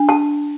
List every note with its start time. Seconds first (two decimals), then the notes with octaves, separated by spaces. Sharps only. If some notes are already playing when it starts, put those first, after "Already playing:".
Already playing: D4
0.09 A5